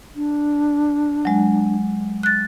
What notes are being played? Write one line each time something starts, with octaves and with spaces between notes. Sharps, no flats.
D4
F#3 G#3
F#6 A6